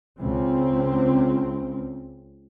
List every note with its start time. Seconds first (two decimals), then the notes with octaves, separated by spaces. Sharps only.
0.19 C#2 C4